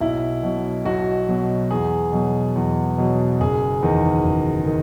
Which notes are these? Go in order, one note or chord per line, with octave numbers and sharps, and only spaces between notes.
B1 E4
B2 F#3
B1 F#4
B2 F#3
E2 G#4
B2 F#3
E2
B2 F#3
F#1 G#4
E2 D#3
F#1
D#3